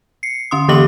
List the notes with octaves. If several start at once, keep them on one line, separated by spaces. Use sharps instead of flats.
C7 C#7
D3 C#4 C6 D#6
D3 E3 A#3 G4 D6 F#7